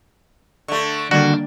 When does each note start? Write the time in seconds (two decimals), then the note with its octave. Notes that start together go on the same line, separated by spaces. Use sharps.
0.68 D3 A3 C#6
1.11 D3 D#3 G3 A#3 D4 F#4